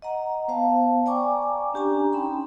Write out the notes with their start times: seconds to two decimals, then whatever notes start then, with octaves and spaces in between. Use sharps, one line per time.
0.02 D#5 F#5 A#5
0.48 B3 C5 F5 A5
1.06 D5 G5 G#5 A#5 C#6 D6
1.73 C#4 D4 G4 G#5 A#5
2.13 C#4 D#4 G5 B5 C6